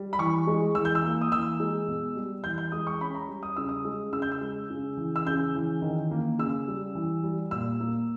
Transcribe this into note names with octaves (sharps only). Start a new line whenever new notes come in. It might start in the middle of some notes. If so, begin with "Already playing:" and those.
Already playing: G3
B5
E3 C#6
G#3
E3 E6
G6
E6
A#3
D#6
E3 E6
G#3
B2
G3
E3 G6
G6
G#3 D#6
C#6
C#4 B5
A#5
G3
D#6
C#3 E6
D#6
G#3
C#3 E6
G6
E6
G#3
C#3
E3
E6
C#3 G6
E3
D#3
A#3
C#3 E6
G3
E3
G3
A#2 E6
A#3